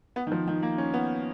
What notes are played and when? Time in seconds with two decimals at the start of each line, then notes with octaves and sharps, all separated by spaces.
0.16 B3
0.27 D#3
0.32 F3
0.48 D#3
0.62 A#3
0.78 C#4
0.94 B3